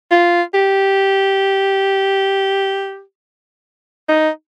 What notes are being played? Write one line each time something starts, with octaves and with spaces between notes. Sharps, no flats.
F4
G4
D#4